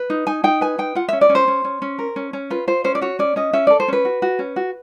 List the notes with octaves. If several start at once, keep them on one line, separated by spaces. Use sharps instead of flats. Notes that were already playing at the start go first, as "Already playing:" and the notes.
Already playing: B4
D#4
D#4 G#5
D#4 G5
B4 G#5
D#4 G5
F4 F#5
C#4 E5
D5
C#4
C5
C#4
C#4
C#4
A#4
C#4
C#4
F4 B4
F4 C5
C#4 C5
D5
F#4 C#5
C#4 D5
C#4 D#5
C#4 E5
A4 D5
C5
C#4 B4
F#4
F#4
C#4
F#4